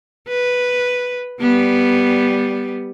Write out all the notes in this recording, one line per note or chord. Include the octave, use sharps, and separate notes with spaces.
B4
G3 B3